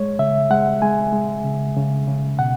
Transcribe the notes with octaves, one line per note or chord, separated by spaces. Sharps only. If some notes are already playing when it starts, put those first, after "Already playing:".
Already playing: G#3 C#5
C#3 E5
G#3 F#5
G#3 G#5
G#3
C#3
C#3
C#3
B2 F#5